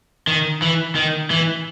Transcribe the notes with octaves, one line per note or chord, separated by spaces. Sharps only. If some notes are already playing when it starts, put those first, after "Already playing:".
D#3
E3
D#3
E3